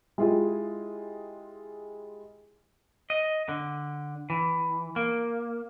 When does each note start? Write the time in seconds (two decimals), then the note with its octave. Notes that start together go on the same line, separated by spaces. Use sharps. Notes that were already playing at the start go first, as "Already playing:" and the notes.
0.18 G#3 E4 F4 G4 G#4
3.10 D#5
3.49 D3
4.30 E3
4.96 A#3